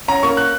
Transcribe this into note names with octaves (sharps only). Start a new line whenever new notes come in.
C#4 A#5
A#3 C#6
F#6